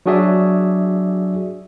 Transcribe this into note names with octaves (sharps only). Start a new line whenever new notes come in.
F#3 D4 F#4 G#4 D5 E5